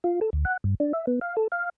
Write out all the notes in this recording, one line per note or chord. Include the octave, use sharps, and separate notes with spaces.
F4
A4
D2
F#5
G2
D4
E5
B3
F5
A4
F5